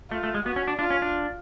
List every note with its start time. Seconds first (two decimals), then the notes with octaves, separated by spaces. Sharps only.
0.11 A3 F4
0.23 A3
0.34 G#3
0.46 B3 F#4
0.56 C#4
0.68 D4
0.79 D4 F4
0.90 C#4
1.02 D4